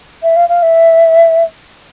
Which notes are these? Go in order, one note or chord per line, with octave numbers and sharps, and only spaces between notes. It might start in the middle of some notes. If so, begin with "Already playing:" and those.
E5
F5
F5
E5